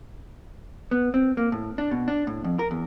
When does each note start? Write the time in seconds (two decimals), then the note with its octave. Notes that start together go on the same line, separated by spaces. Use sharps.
0.91 B3
1.14 C4
1.37 A#3
1.52 A2
1.78 D4
1.91 B2
2.08 D4
2.27 A2
2.44 F2
2.59 A#4
2.71 E2